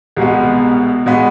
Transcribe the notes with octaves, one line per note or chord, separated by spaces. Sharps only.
C2 B2 G#3 B3
B2 G#3 B3